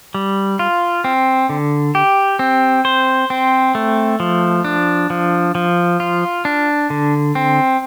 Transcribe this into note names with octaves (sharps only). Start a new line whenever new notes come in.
G3
F4
C4
D3
G4
C4
C5
C4
A3
F3
D4
F3
F3
F4
D4
D3
C4